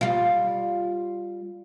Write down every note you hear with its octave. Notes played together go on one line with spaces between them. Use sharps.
G3 F4